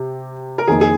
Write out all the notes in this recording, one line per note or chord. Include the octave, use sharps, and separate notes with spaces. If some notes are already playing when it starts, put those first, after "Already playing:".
Already playing: C3 G4
A#4
F2 D#3 A#3 G#4
G#4